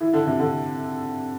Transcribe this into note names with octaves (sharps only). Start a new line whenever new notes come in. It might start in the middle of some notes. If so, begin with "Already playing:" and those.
E3
D3
C3
D3